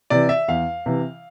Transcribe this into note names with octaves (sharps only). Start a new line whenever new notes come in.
C3 E3 D5
E5
E2 F5
C3 E3